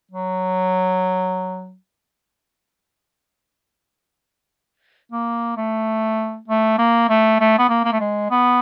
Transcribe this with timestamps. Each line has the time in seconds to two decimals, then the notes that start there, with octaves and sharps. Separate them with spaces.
0.11 F#3
5.12 A#3
5.57 A3
6.48 A3
6.78 A#3
7.09 A3
7.40 A3
7.58 B3
7.69 A#3
7.84 A#3
7.92 A3
8.00 G#3
8.31 B3